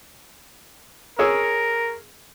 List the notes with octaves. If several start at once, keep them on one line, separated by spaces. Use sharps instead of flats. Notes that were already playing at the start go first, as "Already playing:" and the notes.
G#4 A#4 C#5 E6